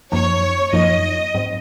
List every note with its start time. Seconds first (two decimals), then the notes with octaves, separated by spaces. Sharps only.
0.12 F#2 F3 A#3 D#4 C#5
0.73 F#2 F3 A#3 D#4 D#5
1.34 G#2 F#3 C4